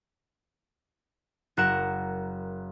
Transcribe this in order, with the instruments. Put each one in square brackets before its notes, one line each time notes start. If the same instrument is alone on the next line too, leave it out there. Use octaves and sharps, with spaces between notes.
[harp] F#1 F#4 A#4 F#5 E7